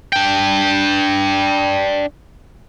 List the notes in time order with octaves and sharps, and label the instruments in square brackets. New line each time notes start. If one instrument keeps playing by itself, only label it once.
[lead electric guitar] D4 G5